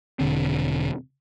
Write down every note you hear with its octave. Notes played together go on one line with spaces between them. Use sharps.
E1 C#2 D3 C4